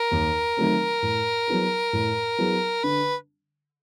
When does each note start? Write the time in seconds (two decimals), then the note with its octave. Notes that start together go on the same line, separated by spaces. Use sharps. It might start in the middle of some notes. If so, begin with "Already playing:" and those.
Already playing: A#4
0.12 D#2
0.57 D#3 F#3 A3 C4
1.02 A2
1.48 F#3 B3 E4 G#4
1.93 A2
2.39 F#3 B3 E4 G#4
2.84 D3 B4